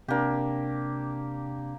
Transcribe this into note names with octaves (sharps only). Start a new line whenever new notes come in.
C3 A#3 D4 G4